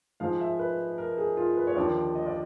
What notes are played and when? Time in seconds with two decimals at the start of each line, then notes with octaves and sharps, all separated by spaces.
0.20 G#2 F3 G#3 F5
0.40 E5
0.59 B4
0.98 A#4
1.18 G#4
1.37 F4
1.57 B4
1.67 C#5
1.75 D#2 D3 F3 D5
2.15 D#5
2.26 D5